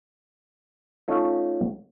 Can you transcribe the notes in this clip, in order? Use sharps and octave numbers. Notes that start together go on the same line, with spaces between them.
A3 C#4 D#4 F4